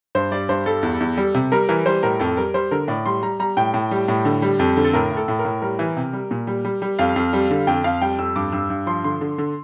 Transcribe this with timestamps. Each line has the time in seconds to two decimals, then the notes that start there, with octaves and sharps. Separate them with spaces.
0.15 G2 C5
0.31 G3 D5
0.49 G2 C5
0.66 G3 A4
0.83 E2
1.00 E2
1.17 G3
1.34 C3
1.52 G3 A#4
1.69 E3 A#4
1.86 G3 C5
2.03 A2 A#4
2.20 F2 A4
2.37 G3 A#4
2.54 G3 C5
2.71 D3 A#4
2.88 A2 D5
3.06 G3 C6
3.22 G3 A#5
3.39 G3 A#5
3.57 A2 G5
3.74 A2
3.91 G3
4.08 A2
4.25 D3
4.42 G3
4.59 F2
4.77 D3
4.85 A4
4.93 A2 A#4
5.11 A2
5.17 A4
5.28 A2
5.39 A#4
5.45 A2
5.62 G3 A#4
5.79 E3
5.97 C3
6.13 G3
6.31 A#2
6.47 G3
6.65 G3
6.82 G3
6.99 F2 F5
7.16 F2
7.33 G3
7.50 D3
7.67 F2 G5
7.84 F2 F5
8.02 G3 G5
8.19 F2 E6
8.36 G2 D6
8.52 G2 E6
8.70 G2
8.86 F3 C6
9.04 D3 C6
9.21 D3
9.38 D3